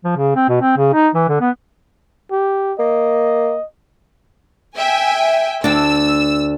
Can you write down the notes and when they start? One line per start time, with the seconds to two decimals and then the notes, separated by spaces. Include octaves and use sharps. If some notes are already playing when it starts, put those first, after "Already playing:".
0.04 F3
0.16 C#3
0.36 C4
0.49 B2
0.61 C4
0.77 C#3
0.93 D#4
1.15 E3
1.28 D3
1.41 B3
2.31 G4
2.79 A#3 D#5
4.77 E5 G5 G#5
5.64 D2 D4 E6